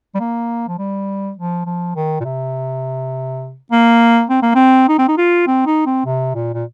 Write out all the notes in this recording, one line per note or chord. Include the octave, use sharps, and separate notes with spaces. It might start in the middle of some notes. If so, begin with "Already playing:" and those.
G3
A#3
F3
G3
F3
F3
D#3
A#2
C3
A#3
C4
A#3
C4
D#4
C4
D#4
F4
C4
D#4
C4
C3
A#2
A#2